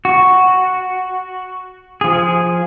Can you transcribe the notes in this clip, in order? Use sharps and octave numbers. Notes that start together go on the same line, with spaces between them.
F#4
F3 G#4